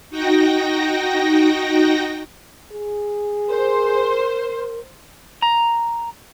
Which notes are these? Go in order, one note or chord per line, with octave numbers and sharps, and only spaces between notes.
D#4 F#4 G5 A#6
G#4
A#4 C5
A#5